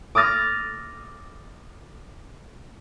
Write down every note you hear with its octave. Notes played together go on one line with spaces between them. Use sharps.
D6 D#6 F6 A6 A#6